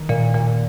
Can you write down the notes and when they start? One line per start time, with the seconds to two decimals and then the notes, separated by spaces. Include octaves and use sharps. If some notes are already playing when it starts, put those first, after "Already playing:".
Already playing: D#3
0.09 A#2
0.34 A#2